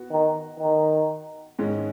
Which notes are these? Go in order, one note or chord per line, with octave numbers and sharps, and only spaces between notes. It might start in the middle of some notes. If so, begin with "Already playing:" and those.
Already playing: B3 F#4
D#3
D#3
G#2 D#3 G#3 C#4 G#4